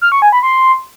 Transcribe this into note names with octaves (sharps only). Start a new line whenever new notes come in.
F6
C#6
G#5
B5
C6